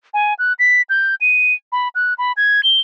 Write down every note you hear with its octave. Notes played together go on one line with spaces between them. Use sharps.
G#5
F#6
B6
G6
D#7
B5
F#6
B5
G#6
G7